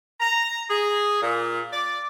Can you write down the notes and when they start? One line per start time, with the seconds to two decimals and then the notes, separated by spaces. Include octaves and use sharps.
0.20 A#5
0.69 G#4
1.22 A#2
1.72 D5